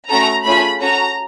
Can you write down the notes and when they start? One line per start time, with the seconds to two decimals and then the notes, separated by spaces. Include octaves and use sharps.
0.09 A3 C#4 F#4 A4 A#5
0.45 A3 C#4 F4 G#4 B5
0.81 C#4 F#4 A4 A#5